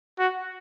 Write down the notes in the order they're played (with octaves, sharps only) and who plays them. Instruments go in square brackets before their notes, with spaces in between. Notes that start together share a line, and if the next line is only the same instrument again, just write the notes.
[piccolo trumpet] F#4